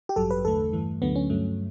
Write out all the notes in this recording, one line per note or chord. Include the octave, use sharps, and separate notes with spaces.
G4
A1 G2 F#3 A4
B4
E2 D3 A3 A4
G2 E3 A3
D2 D3 F#3 A3 B3
C#4
G2 F#3 A3